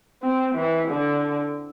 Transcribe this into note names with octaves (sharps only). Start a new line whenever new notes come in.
C4
E3
D3